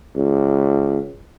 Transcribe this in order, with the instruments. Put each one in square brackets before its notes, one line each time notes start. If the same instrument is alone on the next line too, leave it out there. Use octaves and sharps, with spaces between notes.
[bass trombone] C#2